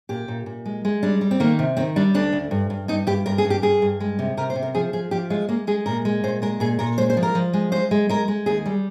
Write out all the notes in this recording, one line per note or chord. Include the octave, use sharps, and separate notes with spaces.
A#2 G4
A#2
A#2
G#3
G#3
G3 D4
G3
C4
D#3 A#3
C3
D#3 C4
G3 D4
D2 D4
D2
G2
G2
G2 D#4
G2 G4
G2 A#4
G#4
G2
G4
G2 G#4
G2
G#3
C3
C3 A#4
C5
C3
A#4
F3 G#4
F3 G#4
F3 G4
G#3 F4
G#3 A#3
G#3 G#4
A#2 A#4
G#3
A#2 C5
G#3 A#4
A#2 G#4
A#2 A#4
G#3 C5
C5
F3
A#4
F3
G#3
G#3 C5
G#3
G#3 A#4
G#3
D#2 G#4
G3